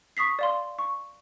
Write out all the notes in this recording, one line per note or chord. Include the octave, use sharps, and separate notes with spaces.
C#6 D#6 B6 C7
D5 F5 C6
C#6